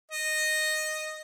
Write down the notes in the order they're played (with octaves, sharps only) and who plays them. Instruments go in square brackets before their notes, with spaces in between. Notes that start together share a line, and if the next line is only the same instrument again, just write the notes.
[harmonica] D#5